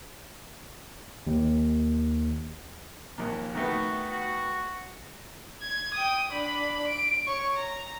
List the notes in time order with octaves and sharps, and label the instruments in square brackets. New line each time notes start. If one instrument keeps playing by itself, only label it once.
[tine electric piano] D#2
[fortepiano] A#1 D#2
[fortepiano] D#3 A3 B3 [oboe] F#4
[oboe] F#4
[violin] G#6
G5 D#6
D4 B5
D7
C#5 C#6
A#5